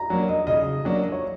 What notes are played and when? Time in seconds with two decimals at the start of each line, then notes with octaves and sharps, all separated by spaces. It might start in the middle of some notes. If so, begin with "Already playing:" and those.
Already playing: A#5
0.10 F#3 A#3 D4
0.29 D#5
0.47 C#3 D#5
0.85 F#3 A#3 D4
1.12 C#5